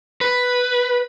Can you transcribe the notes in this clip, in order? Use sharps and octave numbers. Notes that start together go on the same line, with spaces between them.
B4